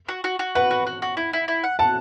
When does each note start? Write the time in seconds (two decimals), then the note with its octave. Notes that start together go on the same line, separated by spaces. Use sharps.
0.09 F#4
0.24 F#4
0.39 F#4
0.55 B4 F#5
0.71 F#4
0.87 F#4
1.02 F#4
1.17 E4
1.33 E4
1.48 E4
1.64 F#5
1.79 F#5 A5